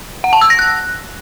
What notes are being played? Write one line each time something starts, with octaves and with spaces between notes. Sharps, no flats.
F#5
A5
E6
A#6
F#6